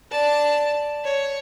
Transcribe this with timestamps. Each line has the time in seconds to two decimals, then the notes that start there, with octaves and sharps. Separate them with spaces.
0.12 D5 A5
1.04 C#5